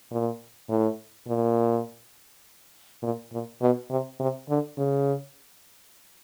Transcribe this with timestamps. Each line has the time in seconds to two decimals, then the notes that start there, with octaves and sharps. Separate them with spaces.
0.11 A#2
0.69 A2
1.27 A#2
3.02 A#2
3.32 A#2
3.61 B2
3.90 C3
4.20 C3
4.49 D3
4.78 C#3